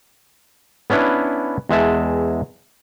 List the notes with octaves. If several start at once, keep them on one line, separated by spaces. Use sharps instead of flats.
B3 C#4 D4 E4 B4
E2 G#3 E5 A5